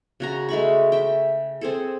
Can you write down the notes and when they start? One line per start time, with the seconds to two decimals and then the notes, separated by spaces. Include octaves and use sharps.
0.20 C#3 F#4 A#5
0.49 G#3 A3 B5 C#6
0.92 E5 G5
1.61 C4 G#4 A4